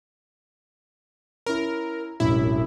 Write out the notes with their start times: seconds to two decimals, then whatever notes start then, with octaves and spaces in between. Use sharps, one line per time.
1.46 C#4 E4 A#4
2.20 E1 A1 F#2 E4